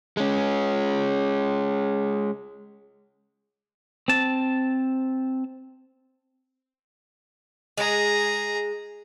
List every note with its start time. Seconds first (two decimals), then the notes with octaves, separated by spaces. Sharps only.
0.17 G#3 C#4
4.08 C4 A5
7.77 G#3 G#4 A#5